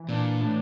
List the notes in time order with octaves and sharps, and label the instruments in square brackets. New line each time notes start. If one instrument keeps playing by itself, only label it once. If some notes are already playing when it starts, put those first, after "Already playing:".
Already playing: [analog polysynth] E3
[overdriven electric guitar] A#2 [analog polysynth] D4
[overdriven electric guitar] A2 [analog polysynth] D4